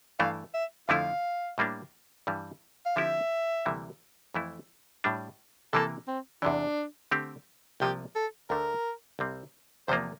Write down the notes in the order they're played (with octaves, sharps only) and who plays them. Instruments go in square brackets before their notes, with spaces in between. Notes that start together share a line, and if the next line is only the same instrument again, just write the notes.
[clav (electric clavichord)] G2 E3 A3 [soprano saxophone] F5
[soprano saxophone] E5
[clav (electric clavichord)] F2 D3 F3 A3 E4 [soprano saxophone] F5
[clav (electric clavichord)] A2 G3 A#3 D4
G2 E3 G3
[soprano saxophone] F5
[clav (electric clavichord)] D3 F3 C4 E4 G4 [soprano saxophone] E5
[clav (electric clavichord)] D2 C3 E3 G3 A#3
F2 E3 A3 E4
A2 G3 D4
[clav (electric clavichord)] C3 E3 A#3 [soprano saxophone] A4
[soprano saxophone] C4
[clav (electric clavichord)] E2 C3 E3 [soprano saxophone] D4
[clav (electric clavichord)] D3 A3 C4 G4
[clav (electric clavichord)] C2 C3 F3 A#3 [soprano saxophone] G4
[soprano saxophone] A4
[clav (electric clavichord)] D2 D3 A3 [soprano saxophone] A#4
[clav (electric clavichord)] C2 C3 G3 C4
[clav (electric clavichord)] E2 C3 F3 A#3 [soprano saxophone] C5